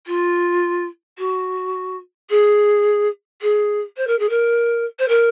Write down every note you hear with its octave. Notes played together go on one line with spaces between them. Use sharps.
F4
F#4
G#4
G#4
C5
A#4
G#4
A#4
C5
A#4